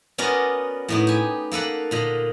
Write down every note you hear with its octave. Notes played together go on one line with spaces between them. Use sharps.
B3 C#4 F#4 A#4 D5 D#5
A2 B3 D#4
G4 G#5
A#3 A4 B4 F#5
A#2 D3 D#5